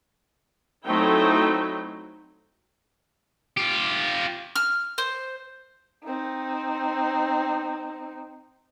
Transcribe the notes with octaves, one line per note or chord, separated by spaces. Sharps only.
F#3 A3 C4 D#4 E4 G5
F4 G4
F6
C5
C4 D#4